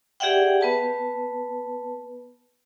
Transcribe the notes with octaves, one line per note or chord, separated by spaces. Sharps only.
G4 G#4 D5 E5 F#5 G5
B3 B4 A5